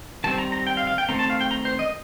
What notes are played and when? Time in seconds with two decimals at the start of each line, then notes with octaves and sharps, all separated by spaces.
0.24 D#3 G3 C4 A5
0.38 A#5
0.52 A#5
0.67 G5
0.77 F5
0.87 F5
0.98 G5
1.09 D#3 A3 C4 A#5
1.19 A5
1.30 F5
1.41 G5
1.51 A#5
1.65 C5
1.79 D#5